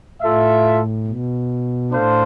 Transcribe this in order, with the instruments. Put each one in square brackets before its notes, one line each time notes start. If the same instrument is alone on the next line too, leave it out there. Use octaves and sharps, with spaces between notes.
[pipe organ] A2 [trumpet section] F4 A4 E5
[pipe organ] B2
[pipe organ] A2 [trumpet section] D4 A4 C5 F5